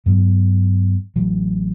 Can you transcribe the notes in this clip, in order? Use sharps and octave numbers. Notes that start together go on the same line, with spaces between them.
G2 F#3 B3
A1 A2 F#3